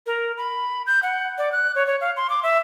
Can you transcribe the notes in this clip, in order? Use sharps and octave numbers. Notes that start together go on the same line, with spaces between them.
A#4
B5
G6
F#5
D5
F#6
C#5
C#5
F5
C6
D6
E5